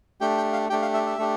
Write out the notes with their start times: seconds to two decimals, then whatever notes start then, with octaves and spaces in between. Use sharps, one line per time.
0.21 A3 D4 G4 G5
0.37 G5
0.53 F5
0.70 A3 D4 G4 G5
0.82 F5
0.94 E5
1.06 E5
1.18 A3 D4 G4